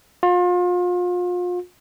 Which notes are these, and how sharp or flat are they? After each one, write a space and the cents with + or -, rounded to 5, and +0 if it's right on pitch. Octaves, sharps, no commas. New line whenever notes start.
F4 +35